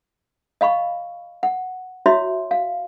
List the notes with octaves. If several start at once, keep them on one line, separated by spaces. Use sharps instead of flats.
D#5 F5 B5 C#6
F#5
E4 F#4 C#5 E5 C6
F5